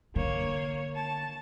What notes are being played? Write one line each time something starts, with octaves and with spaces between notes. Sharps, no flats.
D3 A#3 C#5
A5